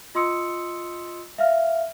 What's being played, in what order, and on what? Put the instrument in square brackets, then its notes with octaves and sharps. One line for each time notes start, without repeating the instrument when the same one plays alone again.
[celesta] F4 D#5 C6 D#6 E6 C#7
E5 F5 F6